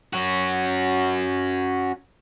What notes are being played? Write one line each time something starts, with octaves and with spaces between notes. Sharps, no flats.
C#4 F#4